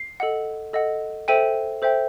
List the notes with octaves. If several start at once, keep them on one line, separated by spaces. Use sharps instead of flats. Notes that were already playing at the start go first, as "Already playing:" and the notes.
Already playing: C7
A4 D#5 F#5
A4 D#5 F#5
A4 C5 E5 G5 D#7
A4 C5 E5 G5